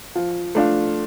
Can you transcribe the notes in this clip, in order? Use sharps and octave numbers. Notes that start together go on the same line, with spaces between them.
F3
A3 D4 F4